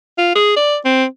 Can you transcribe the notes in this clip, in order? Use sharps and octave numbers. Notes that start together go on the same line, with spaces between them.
F4
G#4
D5
C4